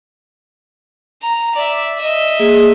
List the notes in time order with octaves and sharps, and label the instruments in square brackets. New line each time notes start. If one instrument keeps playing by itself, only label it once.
[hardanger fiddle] A#5
D5 E5
D#5 E5
[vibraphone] A#3 G#4